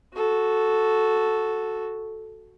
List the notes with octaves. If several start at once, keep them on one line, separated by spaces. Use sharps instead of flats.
F#4 A4